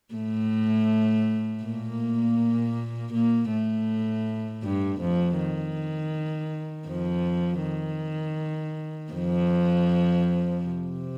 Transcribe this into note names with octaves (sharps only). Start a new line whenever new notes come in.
A2 A3
A#2 A#3
A#2 A#3
A2 A3
G2 G3
F2 F3
D#3
F2 F3
D#3
F2 F3
C3